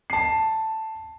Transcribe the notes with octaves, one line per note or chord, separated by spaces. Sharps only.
A5 C7